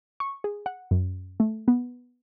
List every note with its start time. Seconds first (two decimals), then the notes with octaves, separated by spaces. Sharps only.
0.20 C#6
0.44 G#4
0.66 F#5
0.91 F#2
1.40 A3
1.68 B3